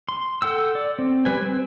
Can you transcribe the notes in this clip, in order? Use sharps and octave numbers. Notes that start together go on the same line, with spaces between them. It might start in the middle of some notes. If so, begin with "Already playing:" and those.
C6
A4 F#5 G5 E6
D5
C4
G3 B4 G#5
C4